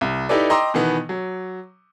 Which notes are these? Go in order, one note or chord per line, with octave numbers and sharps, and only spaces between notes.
C2
D#4 E4 G4 A4 B4 D5
D#5 G5 A#5 C6 D6 E6
B2 D#3 E3 B3
F#3